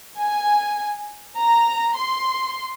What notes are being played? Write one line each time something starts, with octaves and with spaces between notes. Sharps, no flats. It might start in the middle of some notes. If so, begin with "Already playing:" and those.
G#5
A#5
C6